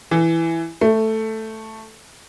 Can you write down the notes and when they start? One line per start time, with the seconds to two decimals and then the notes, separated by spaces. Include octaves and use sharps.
0.11 E3
0.81 A3